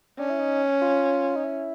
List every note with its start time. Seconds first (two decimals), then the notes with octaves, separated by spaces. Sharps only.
0.19 C#4 D4
0.30 E4
0.40 D#4
0.82 F4
1.36 D#4
1.44 E4